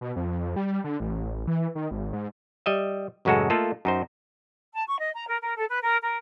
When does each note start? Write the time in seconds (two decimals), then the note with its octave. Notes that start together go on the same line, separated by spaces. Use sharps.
0.01 B2
0.16 F2
0.56 G3
0.84 D3
1.00 A1
1.47 E3
1.75 D#3
1.91 G#1
2.13 G#2
2.66 G3 D#5 E5
3.25 A1 F#2 C#3 G#3 F#4 A4
3.50 A3 A#3 F4 A4 D#5
3.85 F#2 D#4 C5
4.73 A5
4.87 C#6
4.99 D#5
5.15 A#5
5.27 A#4
5.41 A#4
5.57 A4
5.68 B4
5.83 A#4
6.03 A#4